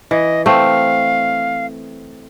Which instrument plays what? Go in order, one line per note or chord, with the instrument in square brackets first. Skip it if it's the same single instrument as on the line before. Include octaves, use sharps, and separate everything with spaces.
[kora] E3 [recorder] D#5
[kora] A3 C4 [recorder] F5